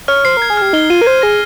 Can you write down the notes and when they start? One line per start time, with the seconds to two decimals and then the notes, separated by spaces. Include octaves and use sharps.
0.08 C#5 F6
0.25 C5 C7
0.37 A#4 G#6
0.50 G#4
0.57 G4 F6
0.73 D#4 G7
0.90 F4 D#7
1.01 A#4
1.06 C5 G#6
1.22 G#4 A#6